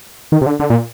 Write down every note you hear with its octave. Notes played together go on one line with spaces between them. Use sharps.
D#3
C3
D3
D3
A#2